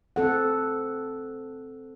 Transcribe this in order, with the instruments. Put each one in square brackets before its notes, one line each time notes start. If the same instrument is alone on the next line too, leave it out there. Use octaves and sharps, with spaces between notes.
[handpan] C4 A4 F#5